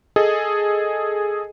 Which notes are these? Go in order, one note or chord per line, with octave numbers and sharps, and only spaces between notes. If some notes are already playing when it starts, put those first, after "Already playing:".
G#4 A4 D#5